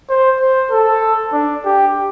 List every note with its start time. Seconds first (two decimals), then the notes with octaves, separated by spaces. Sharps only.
0.09 C5
0.40 C5
0.71 A4
1.33 D4
1.65 G4